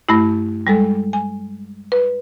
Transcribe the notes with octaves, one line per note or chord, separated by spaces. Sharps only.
G2 A3 E4
G3 G#3 A4
G#5
B4